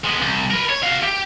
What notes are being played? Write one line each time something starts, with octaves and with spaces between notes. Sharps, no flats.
G#3 B3
C2
A#4 B4
C#5
F#4 F5
G4